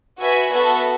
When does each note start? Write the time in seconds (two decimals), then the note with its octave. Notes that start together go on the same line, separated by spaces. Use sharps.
0.20 F#4 B4 E5 G#5
0.51 B3 F#4 A4 E5